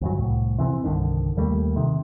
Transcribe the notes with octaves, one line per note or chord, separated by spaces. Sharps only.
D2 G2 F#3
C2 A2
C3 E3 A3 C4
C2 G2 D3 D#3
D#2 G3 A3 A#3
C3 D#3